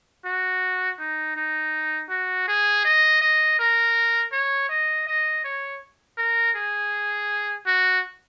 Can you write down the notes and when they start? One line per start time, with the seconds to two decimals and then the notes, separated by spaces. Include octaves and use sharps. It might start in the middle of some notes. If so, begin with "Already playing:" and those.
0.25 F#4
0.99 D#4
1.36 D#4
2.10 F#4
2.48 G#4
2.85 D#5
3.21 D#5
3.59 A#4
4.32 C#5
4.69 D#5
5.07 D#5
5.44 C#5
6.18 A#4
6.56 G#4
7.66 F#4